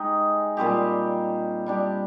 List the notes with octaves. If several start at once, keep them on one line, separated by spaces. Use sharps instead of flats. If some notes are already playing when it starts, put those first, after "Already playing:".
Already playing: G#3 D#4 G4
A#2 G3 C4 G4
G3 D4 G4